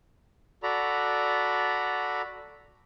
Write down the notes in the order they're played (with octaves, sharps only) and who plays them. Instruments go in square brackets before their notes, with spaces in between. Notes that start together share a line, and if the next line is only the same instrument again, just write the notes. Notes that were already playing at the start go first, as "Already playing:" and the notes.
[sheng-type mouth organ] F#4 A4 D5 A#5 B5